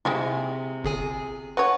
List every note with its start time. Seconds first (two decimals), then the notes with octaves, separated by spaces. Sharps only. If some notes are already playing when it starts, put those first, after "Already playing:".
0.05 C3 G#3 C4 E4
0.84 G1 G#4 G#5
1.57 F#4 B4 C#5 F#5